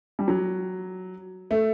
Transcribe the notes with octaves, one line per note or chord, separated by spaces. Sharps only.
G3
F#3
A3